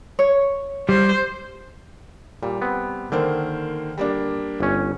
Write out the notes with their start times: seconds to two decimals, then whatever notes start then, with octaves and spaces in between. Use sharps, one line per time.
0.19 C#5
0.89 G3 C5
2.43 A#2 G3
2.62 B3 C4
3.12 D3 D#3 A#3 C5
3.98 G3 A#3 D4
4.60 G1 C#4